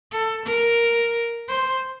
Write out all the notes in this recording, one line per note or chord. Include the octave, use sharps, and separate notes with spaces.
A4
A#4
C5